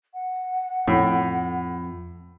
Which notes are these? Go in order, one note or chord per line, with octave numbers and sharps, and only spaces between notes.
F#5
F2 A2